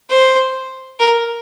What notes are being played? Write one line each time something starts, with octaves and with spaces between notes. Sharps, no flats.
C5
A#4